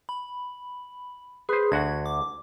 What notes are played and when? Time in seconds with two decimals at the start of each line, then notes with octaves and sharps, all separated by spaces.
0.09 B5
1.49 G#4 B4 C5
1.72 D2 F#4 F#5 G#6
2.06 D6